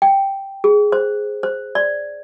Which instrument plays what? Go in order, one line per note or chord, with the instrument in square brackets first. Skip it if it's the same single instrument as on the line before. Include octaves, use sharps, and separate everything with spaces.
[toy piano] G5
G#4
C5
C5
D5